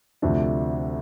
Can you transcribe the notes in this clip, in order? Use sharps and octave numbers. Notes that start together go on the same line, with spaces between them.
D2 C3 F3 A3 D4